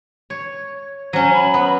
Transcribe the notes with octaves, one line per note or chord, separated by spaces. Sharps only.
C#5
F#3 C#4 C5
B5
B3